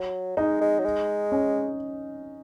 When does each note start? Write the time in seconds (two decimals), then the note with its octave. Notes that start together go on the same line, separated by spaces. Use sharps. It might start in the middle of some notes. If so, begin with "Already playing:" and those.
Already playing: F#3
0.37 G#3 D#4
0.61 G#3
0.79 F#3
0.84 G#3
1.32 C#4